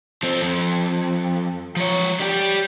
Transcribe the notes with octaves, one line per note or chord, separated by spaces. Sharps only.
F3 C4
F2
F3 C#5
G3 G4